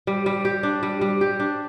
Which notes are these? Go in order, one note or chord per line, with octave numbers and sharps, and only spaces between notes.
G3
G3
G4
D4
G3
G3
G4
D4